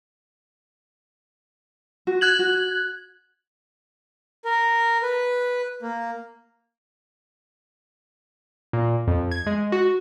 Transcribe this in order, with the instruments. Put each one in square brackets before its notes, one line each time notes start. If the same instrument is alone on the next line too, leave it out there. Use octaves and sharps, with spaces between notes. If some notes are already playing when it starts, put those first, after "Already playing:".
[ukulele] F#4
[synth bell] F#6 G#6 F#7
[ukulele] F#4
[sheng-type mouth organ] A#4
B4
A#3
[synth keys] A#2
F2
G#6
G#3
F#4